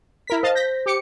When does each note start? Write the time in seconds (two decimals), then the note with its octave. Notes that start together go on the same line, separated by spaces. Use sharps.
0.27 E4 A#4 B6
0.43 C5 D#5 F5 A5
0.55 G6 A#6 B6
0.86 G4 D6 C#7